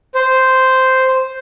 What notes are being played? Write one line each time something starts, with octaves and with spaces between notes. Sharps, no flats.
C5